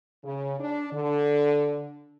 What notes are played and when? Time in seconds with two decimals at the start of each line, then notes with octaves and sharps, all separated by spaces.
0.25 C#3
0.60 D4
0.93 D3